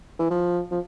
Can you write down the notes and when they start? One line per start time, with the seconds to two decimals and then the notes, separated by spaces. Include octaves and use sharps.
0.19 E3
0.30 F3
0.71 F3